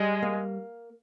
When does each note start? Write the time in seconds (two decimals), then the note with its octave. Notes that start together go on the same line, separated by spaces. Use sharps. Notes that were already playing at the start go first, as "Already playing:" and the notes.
Already playing: G3 G#3
0.23 A#3